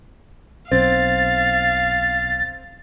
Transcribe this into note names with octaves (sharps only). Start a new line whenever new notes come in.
B1 C4 F5 A6